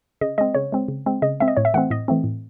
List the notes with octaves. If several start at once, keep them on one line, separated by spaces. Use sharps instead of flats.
C#3 D#5
G#3 C4 D#5
C#3 C#5
G#3 C4
C#3
G#3 C4
C#3 D#5
G#3 C4 E5
D#5
A2 C#5
E5
E3 A3 C4 F#5
A2 D#5
E3 A3 C4
A2